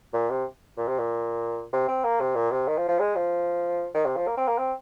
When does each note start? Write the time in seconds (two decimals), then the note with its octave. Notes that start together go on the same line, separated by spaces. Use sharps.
0.14 A#2
0.30 C3
0.77 A#2
0.87 C3
0.99 A#2
1.73 C3
1.88 C4
2.04 A#3
2.20 C3
2.35 A#2
2.51 C3
2.68 D#3
2.78 F3
2.89 F3
2.99 G#3
3.15 F3
3.94 D#3
4.06 C3
4.17 F3
4.27 A#3
4.37 C4
4.48 A#3
4.58 C4